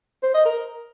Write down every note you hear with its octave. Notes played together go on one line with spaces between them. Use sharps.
C5
D#5
A#4